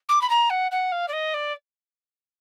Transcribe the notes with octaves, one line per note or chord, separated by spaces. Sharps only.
D6
B5
A#5
F#5
F#5
F5
D5
D#5
D5